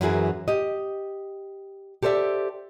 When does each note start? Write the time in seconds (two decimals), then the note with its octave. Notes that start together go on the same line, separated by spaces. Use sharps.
0.01 F#2 E3 F#4 G#4 A#4
0.48 G4 D#5
2.03 G4 A4 C5 D5 E5